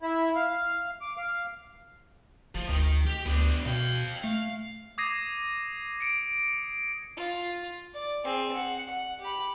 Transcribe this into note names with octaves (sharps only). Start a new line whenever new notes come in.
E4
F5
D6
F5
F#1 F3
D2 D#3 D#4
G4
D2 B3 D4
B2 F5 G5
A3 F5
D6 D#6 G#6 A#6 C7 D#7
C#7 D7
F4
D5
C4 G#4
F#5
F#5
G4 B5